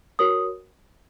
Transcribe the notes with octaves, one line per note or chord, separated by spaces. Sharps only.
F#4 A#4 C#5 D#6